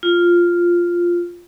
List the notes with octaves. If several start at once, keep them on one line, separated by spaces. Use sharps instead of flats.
F4